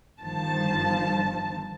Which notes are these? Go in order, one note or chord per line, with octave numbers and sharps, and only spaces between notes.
G1 D#3 F3 A5